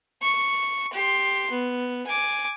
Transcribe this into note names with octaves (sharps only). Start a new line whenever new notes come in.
C#6
G4 C6
B3
G#5 D6